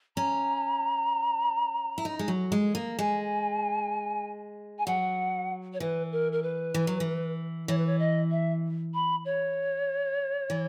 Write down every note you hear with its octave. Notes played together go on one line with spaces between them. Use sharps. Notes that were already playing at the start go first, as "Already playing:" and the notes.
C#4 A#5
E4
D#4
G#3
F#3
G#3
A#3
G#3 G#5
G#5
F#3 F#5
C#5
E3 B4
A#4
A#4
B4
E3
F#3
E3
E3 C#5
B4
C#5
D#5
E5
B5
C#5
E3